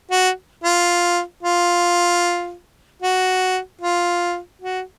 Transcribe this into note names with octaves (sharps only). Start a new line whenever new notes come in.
F#4
F4
F4
F#4
F4
F#4